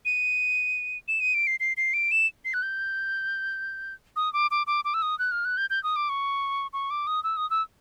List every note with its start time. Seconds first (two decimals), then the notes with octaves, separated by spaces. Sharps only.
0.05 D#7
1.08 E7
1.20 D#7
1.34 D7
1.47 C7
1.60 C7
1.77 C7
1.94 D7
2.11 E7
2.45 C7
2.54 F#6
2.63 G6
4.16 D#6
4.33 D6
4.51 D6
4.67 D6
4.85 D6
4.94 E6
5.02 D#6
5.19 F#6
5.32 F6
5.45 F#6
5.57 G6
5.70 G6
5.84 D#6
5.96 D6
6.09 C#6
6.73 C#6
6.91 D6
7.07 D#6
7.24 E6
7.37 D#6
7.50 E6